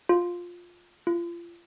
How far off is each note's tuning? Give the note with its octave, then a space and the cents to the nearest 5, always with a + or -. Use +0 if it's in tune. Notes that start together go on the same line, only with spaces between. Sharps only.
F4 +10
F4 -30